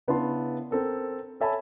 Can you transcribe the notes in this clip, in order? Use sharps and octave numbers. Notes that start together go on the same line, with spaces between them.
C#3 B3 D4 E4 A5 C6
C4 A4 A#4
A4 C#5 E5 G#5 A5 B5